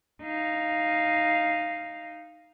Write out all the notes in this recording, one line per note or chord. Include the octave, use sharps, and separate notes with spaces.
D#4 F5